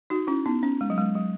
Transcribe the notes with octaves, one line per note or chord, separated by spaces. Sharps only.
D#4 F#4
C#4 E4
B3 D#4
C#4
G#3
F#3
G#3
F#3